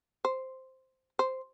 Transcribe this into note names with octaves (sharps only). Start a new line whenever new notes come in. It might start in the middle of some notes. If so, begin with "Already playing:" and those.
C5
C5